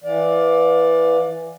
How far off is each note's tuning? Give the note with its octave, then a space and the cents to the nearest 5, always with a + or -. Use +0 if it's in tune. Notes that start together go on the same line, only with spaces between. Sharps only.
E3 +0 D5 +0 F5 +35